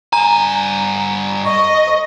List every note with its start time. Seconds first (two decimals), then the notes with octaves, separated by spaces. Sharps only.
0.13 G2 G#5 A#5
1.45 D#5 C#6